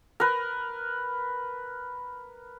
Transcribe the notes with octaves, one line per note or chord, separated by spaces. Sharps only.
A#4 B4